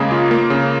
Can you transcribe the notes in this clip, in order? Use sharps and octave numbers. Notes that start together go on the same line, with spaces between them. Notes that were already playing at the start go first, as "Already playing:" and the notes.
Already playing: C#3 G#3 A#3 G#4
F4
A#3
C#3